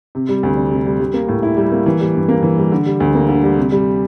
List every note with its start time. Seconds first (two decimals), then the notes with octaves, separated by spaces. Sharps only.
0.15 C3
0.29 G3
0.43 D2
0.57 D4
0.71 C3
0.86 G3
1.00 G3
1.14 A#3
1.28 A2
1.43 E4
1.57 G3
1.72 A#3
1.86 E3
2.00 G3
2.15 G2
2.29 A#3
2.43 E3
2.58 G3
2.72 D3
2.86 G3
3.00 D2
3.15 A#3
3.29 D3
3.43 G3
3.58 C3
3.72 G3